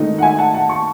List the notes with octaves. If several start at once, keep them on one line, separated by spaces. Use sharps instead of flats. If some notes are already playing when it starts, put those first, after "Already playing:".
Already playing: G#2 D#3 A3 D#4
F#5
E5 G#5
F#5 A5
F#5 A5
A5 C#6